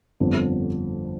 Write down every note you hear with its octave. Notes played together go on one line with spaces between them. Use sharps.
G1 F2 D3